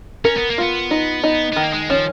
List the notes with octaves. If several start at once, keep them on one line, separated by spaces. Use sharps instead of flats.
C#4 A#4
B3
A#3
B3 F4
D#4
D#4
D#3 B3
A#3
G#3
F3 C#4